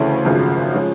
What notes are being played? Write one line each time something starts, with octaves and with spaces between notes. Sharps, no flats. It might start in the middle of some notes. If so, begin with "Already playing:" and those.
Already playing: D2 C#3 E3 A3 C#4
G#1 F#2 C#3 F3
F3 G#3 C#4